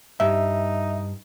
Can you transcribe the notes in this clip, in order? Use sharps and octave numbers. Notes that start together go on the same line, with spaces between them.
G2 D#4 E5